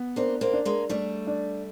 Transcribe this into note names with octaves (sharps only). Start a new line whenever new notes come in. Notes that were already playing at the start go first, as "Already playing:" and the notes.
Already playing: B3
A#3 C4 D4
A#3 C4
D4
G#3 A#3
G3 A3 D4
D4